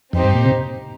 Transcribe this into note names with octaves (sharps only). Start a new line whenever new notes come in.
F2 C4 D#4 G4 C5
G2
A#2
C3